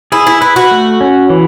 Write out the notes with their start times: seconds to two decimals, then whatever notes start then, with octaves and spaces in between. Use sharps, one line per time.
0.12 E4 G#4
0.27 E4
0.41 E4 B4
0.56 F#4
0.71 A3
1.01 C#4
1.30 E3